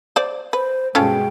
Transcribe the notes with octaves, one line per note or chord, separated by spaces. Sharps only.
C5 D5
B4 C5
G2 B2 G#3 C#4 F4 A4 G5